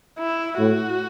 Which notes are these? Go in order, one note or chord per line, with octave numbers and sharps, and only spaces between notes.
E4
A2 F#4